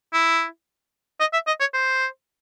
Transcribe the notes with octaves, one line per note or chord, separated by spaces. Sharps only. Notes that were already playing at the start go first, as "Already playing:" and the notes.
E4
D#5
E5
D#5
C#5
C5